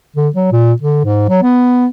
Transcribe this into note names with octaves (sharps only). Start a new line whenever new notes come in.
D3
F#3
A#2
D3
G#2
F#3
B3